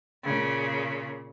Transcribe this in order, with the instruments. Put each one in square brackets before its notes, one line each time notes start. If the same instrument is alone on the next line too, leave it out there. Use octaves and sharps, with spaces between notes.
[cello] A#2 C#3